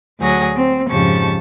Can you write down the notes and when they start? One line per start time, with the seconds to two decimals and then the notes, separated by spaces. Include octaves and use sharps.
0.20 D2 F#3 G#4 A#6
0.57 C4
0.90 F2 G#2 C#3 G4 A5 C#6